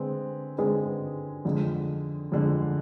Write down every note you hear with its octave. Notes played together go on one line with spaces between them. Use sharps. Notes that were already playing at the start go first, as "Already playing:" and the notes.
Already playing: D3 G#3 C4 G#4 B4
D3 G#3 C4 G#4 B4
F2 D3 G#3
F2 D3 G#3